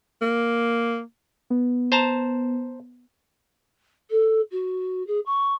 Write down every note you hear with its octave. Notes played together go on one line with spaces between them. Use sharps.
A#3
B3
C5 A5 A#5
A4
F#4
G#4
C#6